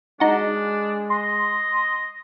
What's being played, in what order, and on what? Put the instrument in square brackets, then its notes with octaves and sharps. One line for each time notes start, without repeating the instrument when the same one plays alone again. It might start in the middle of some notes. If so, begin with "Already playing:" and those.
[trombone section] G#3 [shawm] D4 [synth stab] D#4 F#4
[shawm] D#5 [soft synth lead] C6